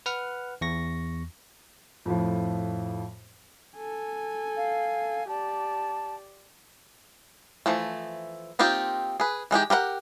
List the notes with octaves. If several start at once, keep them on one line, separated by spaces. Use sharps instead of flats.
B4 F#5 F6
E2 C#6 A#6
F2 A2 F3
A4 G#5
F5
G4 D5 A5
E3 F3 A3
A#3 C4 D#4 F4 G4
G#4 B4
E3 G#3 D#4 G4
G4 A#4 B4 F#5